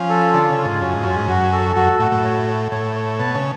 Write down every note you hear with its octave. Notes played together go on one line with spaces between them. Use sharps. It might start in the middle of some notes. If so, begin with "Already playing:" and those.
Already playing: F3 C#4
A4
D3 F4
C#3
F4
G#2
F#2 C#4
G#2
F#2 C#4
G#2
F#2 F#4
A4
F#2 F#4
A2 F#4
A2
C#5
C#5
A2 C#5
C#5
B2 A5
C#3